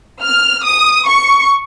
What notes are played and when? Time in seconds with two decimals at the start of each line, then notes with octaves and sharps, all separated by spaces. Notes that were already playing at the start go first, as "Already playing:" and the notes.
0.22 F6
0.64 D#6
1.07 C#6